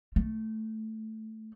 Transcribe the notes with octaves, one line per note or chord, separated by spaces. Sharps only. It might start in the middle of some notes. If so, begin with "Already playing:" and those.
A3